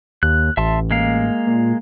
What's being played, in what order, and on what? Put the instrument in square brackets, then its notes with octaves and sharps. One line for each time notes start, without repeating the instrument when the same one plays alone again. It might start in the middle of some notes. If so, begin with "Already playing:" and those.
[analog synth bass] D#2 [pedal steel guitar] F#6
[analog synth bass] A1 [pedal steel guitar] E5 A5 C6
[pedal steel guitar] G#3 A#3 F5
[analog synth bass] A#2